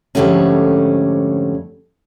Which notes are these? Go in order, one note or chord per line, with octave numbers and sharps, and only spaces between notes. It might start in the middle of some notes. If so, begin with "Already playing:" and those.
F2 G#2 D3 G3 A3 C#4